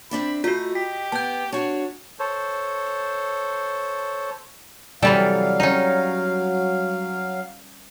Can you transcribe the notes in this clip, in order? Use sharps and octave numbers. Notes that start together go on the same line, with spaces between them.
C4 D4 E5 B5
A3 F4 F#4 D#5
G4 B6
B3 A5 G6
D4 F#4 C#5
A4 C5 C#5
C3 E3 F#3 G3 A4 F5
C#4 D#4